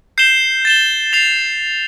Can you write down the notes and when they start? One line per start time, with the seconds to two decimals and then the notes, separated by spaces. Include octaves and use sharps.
0.18 G6 C7 E7 G7
0.65 A6 E7 G7
1.13 A6 C7 F7